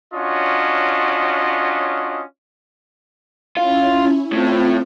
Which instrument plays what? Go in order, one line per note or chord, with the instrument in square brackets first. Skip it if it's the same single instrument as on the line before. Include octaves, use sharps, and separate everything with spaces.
[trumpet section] C#4 D4 F4 F#4 C#5 D#5
[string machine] C#4 E4 [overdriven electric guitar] F4
[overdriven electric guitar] A2 [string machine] C4 F4